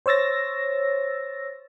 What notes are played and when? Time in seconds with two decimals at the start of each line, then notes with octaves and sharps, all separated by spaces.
0.06 C5 C#5 E6 A6 A#6